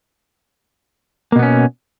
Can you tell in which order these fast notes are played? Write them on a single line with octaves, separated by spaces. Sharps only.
A#3 B2 B3 C#4